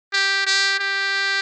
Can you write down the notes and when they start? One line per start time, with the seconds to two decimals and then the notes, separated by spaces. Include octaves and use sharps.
0.13 G4
0.46 G4
0.79 G4